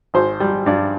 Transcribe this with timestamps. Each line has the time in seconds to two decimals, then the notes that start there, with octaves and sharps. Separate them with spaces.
0.14 G#1 C5
0.40 G3
0.66 G2 D5